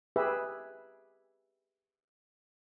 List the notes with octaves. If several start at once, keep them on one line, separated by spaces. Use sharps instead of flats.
G4 G#4 B4 E5